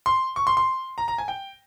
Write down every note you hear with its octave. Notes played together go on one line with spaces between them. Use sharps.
C6
C#6
C6
C6
A#5
A#5
G#5
G5